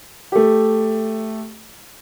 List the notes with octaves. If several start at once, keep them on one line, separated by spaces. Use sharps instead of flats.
A3 G4